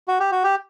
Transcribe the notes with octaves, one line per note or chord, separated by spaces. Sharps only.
F#4
G4
F#4
G4